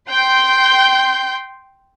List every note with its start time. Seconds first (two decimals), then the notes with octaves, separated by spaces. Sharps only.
0.10 G5 C6 G6